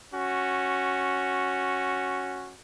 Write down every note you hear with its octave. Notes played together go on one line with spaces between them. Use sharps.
C#4 F#4